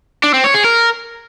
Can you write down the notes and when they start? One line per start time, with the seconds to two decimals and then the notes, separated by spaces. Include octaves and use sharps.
0.24 D4
0.34 C4
0.44 C#5
0.54 G#4
0.64 A#4